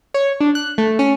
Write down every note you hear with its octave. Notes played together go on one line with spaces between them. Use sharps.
C#5
D4
F#6
A3
C#4